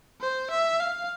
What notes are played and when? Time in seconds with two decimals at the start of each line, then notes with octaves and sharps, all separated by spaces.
0.21 C5
0.51 E5
0.80 F5